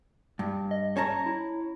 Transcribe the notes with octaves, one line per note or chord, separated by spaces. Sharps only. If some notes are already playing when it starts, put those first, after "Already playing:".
G2
D#5
C#4 C#5 A5 A#5
E4